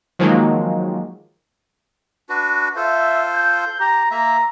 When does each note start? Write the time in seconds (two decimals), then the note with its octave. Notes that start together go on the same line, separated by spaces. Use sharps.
0.19 D#3 F3 F#3 G#3 A#3
2.29 D4 F#4 B4
2.76 F4 A4 C5 E5
3.34 G6
3.80 G4 A#5
4.11 A#3 E5 A#5